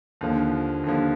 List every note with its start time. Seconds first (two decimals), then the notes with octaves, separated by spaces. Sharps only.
0.21 D#2 D3 F3
0.84 D#2 D3 F3